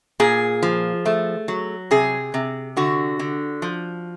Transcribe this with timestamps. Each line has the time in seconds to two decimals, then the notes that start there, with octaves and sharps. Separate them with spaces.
0.20 A#2 G#4
0.63 F3
1.06 A3
1.48 F#3
1.91 C3 G#4
2.34 C3
2.77 D3 F#4
3.19 D3
3.62 F3